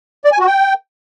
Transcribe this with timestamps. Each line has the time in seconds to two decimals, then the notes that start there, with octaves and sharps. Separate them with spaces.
0.24 D5
0.32 G#5
0.39 F#4
0.46 G5